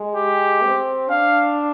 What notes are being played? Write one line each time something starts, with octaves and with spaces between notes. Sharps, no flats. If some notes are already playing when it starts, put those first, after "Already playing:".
Already playing: G#3
G4
C4
D4 F5